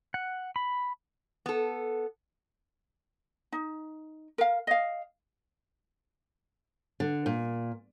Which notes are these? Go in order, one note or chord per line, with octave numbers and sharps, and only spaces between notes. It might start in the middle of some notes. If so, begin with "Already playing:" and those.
F#5
B5
B3 A4
D#4
A#4 F5
D#5 F5
D3
A#2